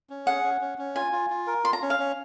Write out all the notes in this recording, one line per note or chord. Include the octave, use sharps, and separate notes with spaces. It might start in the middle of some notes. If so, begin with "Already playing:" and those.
C#4
G#4 F#5
C#4
C#4
C#4
F4 G#5
F4
F4
A#4
F4 C6
A#5
C#4
F5
C#4